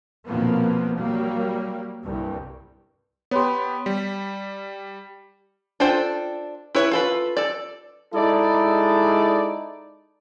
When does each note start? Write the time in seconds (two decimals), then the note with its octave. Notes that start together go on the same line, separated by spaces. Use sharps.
0.25 A#1 F2 B2 F3 A#3 B3
0.96 F#3 G3 A#3
2.04 C2 G2
3.31 B3 G4 C#5 B5 C6
3.86 G3 B6
5.80 D4 F4 A4 C5 G5
6.75 E4 B4 C#5
6.92 F4 A4 B4
7.37 A4 D5
8.14 G#3 D#4 E4 A4 D5